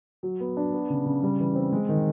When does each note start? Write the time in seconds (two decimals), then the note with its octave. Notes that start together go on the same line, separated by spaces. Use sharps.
0.23 F#3
0.40 B3
0.57 D4
0.73 B3
0.90 C#3
1.06 C#3
1.23 G3
1.39 E3
1.55 C4
1.72 G#3
1.89 D#3